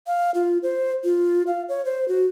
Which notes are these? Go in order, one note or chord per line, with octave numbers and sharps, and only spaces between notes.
F5
F4
C5
F4
F5
C#5
C5
F#4